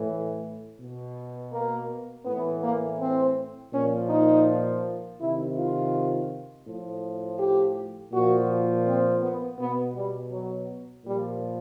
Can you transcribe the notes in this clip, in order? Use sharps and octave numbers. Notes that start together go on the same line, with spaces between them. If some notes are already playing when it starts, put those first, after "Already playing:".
Already playing: A2 E3
B2
A#3
A2 E3 B3
A#3
C4
A#2 F3 C#4
D#4
C3 D#3 E4
F4
A2 F3
G4
A#2 F3 F#4
C4
B3
B2 B3
G3
F#3
A#2 F3 G3